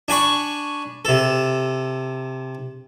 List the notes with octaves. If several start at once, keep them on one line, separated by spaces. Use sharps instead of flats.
D4 G#5 B5 C#6
C3 A4